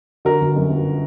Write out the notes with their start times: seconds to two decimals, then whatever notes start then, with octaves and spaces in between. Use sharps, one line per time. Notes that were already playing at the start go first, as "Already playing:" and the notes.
0.25 D3 F#4 A#4
0.41 G1
0.56 F#2
0.70 G1